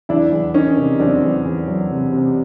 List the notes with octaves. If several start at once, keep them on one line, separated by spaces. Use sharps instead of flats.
E2 D4 E4
E2
D#3 C#4 D#4
C3
E2 C4 D4
E2
E2
F#3
C3
C3